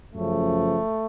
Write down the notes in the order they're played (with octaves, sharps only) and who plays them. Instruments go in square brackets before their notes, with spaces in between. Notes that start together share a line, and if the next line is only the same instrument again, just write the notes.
[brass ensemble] F#2 C#3 F3 A3